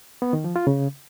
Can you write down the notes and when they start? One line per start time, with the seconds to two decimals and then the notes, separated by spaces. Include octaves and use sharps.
0.22 B3
0.33 D#3
0.44 F3
0.56 F4
0.67 C#3